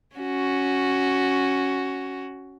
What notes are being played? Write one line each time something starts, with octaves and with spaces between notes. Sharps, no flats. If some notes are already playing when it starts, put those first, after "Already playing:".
C#4 F#4